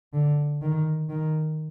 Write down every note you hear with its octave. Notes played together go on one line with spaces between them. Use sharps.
D3
D#3
D#3